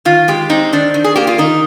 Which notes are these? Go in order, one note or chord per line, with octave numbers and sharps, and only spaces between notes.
D#3 F4
G#3 G4
C4 D#4
D#3 D4
D#3
G#4
A#3 G4
F4
D#3 D#4